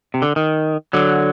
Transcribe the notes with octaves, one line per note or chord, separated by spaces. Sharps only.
C3
D3
D#3
D3 F#3